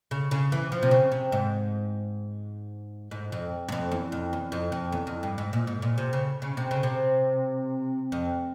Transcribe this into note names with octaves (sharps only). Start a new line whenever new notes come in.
C#3
C#3
E3
F3
C3
C#3
C3
G#2
G#2
F2
G2
F2
E2
F2
E2
F2
F2
E2
F2
G2
G#2
A#2
G#2
A#2
C3
C#3
C#3
C3
C#3
C3
F2